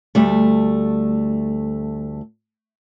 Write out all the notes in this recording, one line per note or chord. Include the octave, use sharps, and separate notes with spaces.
D2 G3 A3